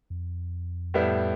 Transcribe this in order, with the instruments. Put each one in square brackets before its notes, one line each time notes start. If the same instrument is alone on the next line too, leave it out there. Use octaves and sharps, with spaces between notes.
[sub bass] F2
[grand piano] A2 G3 B3 E4